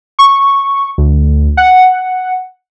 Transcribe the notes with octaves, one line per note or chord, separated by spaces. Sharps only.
C#6
D2
F#5